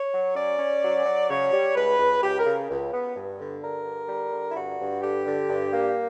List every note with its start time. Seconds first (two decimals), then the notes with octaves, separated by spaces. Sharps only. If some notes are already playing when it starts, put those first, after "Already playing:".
Already playing: C#5
0.12 F#3
0.36 C#4 D5
0.59 C#4
0.83 F#3
1.06 F#3
1.30 C#3 C#5
1.52 G3
1.75 C#2 B4
1.99 C#2
2.22 C#2 G4
2.38 A#4
2.45 C#3
2.70 C#2
2.93 B3
3.16 G2
3.39 D3
3.62 G2 A#4
3.86 D3
4.09 G3
4.32 D3
4.48 E4
4.56 G2 F#4
4.80 G2
5.02 D3 G4
5.26 D3
5.49 G2
5.73 A#3